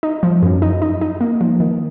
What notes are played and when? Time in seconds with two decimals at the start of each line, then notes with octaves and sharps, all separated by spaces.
0.03 D#4
0.23 F3
0.43 F#2
0.62 D#4
0.82 D#4
1.01 D#4
1.21 A#3
1.41 F3
1.60 D#3